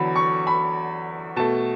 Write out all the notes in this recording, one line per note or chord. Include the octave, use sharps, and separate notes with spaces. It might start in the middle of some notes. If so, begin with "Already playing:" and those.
Already playing: E2 D3 F#3 B5
C#6
B5
B2 A3 A5